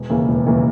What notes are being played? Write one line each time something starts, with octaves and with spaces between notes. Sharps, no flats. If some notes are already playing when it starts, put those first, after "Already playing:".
Already playing: E1
D#2 C#3 E3 A#3
E1
D#2 C#3 E3 A#3